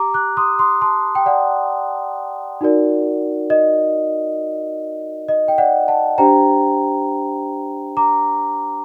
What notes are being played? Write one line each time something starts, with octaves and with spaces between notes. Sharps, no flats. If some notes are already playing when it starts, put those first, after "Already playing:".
Already playing: G4 A#5 D6
D6 F#6
C6 D#6
C6 D#6
A5 C6
G5
D5 F#5
D#4 F#4 A#4 D5
D#5
D#5
G5
D5 F#5
F#5 A5
D4 G4 C5 G5 A#5
A#5 D6